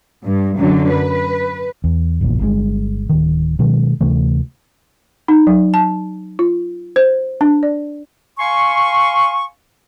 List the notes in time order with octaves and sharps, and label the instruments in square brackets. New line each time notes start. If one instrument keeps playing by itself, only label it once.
[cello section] G2
F#2 D3 F#3
B4
[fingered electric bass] E2
F1 A#1 E2 A#2
G1 G2 A#2 G#3
D1 D#3
B2 D#3 F#3 G#3
D2 C3 E3 A3
[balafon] D#4
F#3
A5
F4
C5
D4
D5
[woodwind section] F5 G#5 C6 C#6